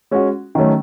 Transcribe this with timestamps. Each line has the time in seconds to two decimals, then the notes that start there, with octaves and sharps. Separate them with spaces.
0.11 G#3 C#4 F#4
0.55 D#3 F#3 A3 C#4